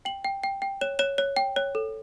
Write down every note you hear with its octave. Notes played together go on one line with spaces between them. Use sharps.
G5 F#7
G5
G5
G5
C#5 E7
C#5 E7
C#5
G5
C#5
A4